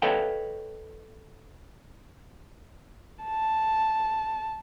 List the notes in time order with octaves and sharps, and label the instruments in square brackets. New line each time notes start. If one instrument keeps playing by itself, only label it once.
[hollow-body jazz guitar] A4 B4 C#5 D#5 F5 G5
[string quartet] A5